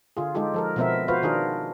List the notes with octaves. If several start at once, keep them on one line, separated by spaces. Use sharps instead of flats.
D3 F4 G#4
G#3 D#4 F4 G4 A4
F3 A4 A#4
B2 F3 B3 C4 A#4 E5
F4 F#4 B4 C5 F5
D#3 D4 F4 G#4 A#4